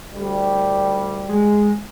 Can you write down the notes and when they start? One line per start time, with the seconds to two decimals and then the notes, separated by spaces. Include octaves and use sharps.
0.14 D2 G3
1.29 G#3